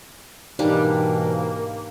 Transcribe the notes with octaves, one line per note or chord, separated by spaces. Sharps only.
G#2 B2 E3 G3 A#3 D4 D#4